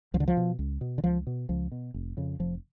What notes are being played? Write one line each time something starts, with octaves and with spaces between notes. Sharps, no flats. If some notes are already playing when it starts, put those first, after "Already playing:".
C#2 F3
D3
F3
B2
C#2
B2
D3
C#2 F3
B2
C#2 F3
B2
F1
F2 C#3
F1 F3